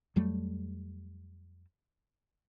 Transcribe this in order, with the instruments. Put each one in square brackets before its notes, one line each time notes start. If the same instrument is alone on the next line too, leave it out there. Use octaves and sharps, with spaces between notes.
[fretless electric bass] F2 F#3 G3 A3